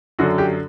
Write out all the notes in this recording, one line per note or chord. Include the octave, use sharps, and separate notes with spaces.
F#2 D3 F#3 F#4
G4